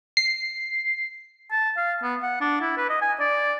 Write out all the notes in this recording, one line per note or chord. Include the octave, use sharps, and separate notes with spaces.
C7
A5
F5
B3
F#5
D4
E4
B4
D#5
G#5
D5